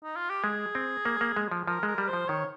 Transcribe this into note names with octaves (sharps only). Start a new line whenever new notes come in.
D#4
F4
G4
G#3 G#4
C4
A#3
A#3
G#3
F3
F3 A#4
G#3 A#4
G3
C5
F3
D#3 C#5